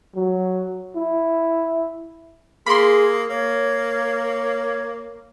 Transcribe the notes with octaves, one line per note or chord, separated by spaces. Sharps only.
F#3
E4
A#3 G#4 B5 C6
A#3 C#5